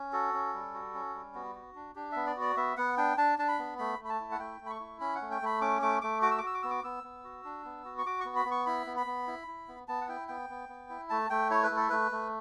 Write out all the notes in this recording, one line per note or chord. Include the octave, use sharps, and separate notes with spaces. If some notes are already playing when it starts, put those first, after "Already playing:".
Already playing: C#4
F#4 A4
C#4
G3
F#4
C#4
G3
B3 F#4
F#4
D4
D4 G4
B3 E5
D5
F#4 D5
B3 E5
B3 F#5
D4 G5
D4 A5
D4 A5
B5
B3
A3 B5
A3
B5
A5
E4
F#5
A3 G5
A3
B5
C#6
E4
C#4 B5
F#5
A3
G5
A3 B5
C#4 D6
A3 D6
A3 D6
F#4 D6
E6
D6
F#4 E6
D6
B3 E6
D6
B3 E6
B3
F#4
D4
B3
F#4
C#6
F#4 D6
B3 C#6
B5
B3
C#6
E4 B5
B3
B5
B3
E4
E4
B3
B3 A5
F#5
E4 G5
B3 G5
B3
B3
E4
A3 A5
A3 G5
E4 C#5
B4
A3
A4
A3 B4
A3